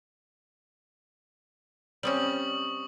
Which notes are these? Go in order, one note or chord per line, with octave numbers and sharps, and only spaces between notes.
G3 C4 C#4 C#6 D#6 F#7